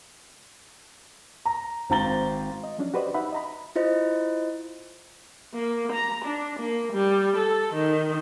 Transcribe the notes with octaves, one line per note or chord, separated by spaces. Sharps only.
A#5
G#1 C4 F5 A#5 A6 G7
D#5
F3 F#3 C#4 D4
F#4 G4 B4 C5 D5 D#5
D#4 E5 F#5 B5
D#5 A#5 B5
E4 F4 C5 D#5
A#3
A#5
D4
A#3
G3
A4
D#3